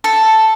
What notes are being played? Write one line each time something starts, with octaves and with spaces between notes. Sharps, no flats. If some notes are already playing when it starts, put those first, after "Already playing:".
A4